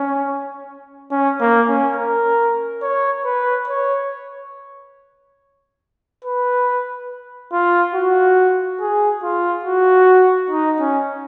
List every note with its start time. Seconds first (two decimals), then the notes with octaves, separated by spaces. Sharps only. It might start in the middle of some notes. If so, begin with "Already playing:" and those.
Already playing: C#4
1.12 C#4
1.40 A#3
1.68 C#4
1.97 A#4
2.82 C#5
3.25 B4
3.68 C#5
6.25 B4
7.53 F4
7.95 F#4
8.80 G#4
9.23 F4
9.65 F#4
10.50 D#4
10.80 C#4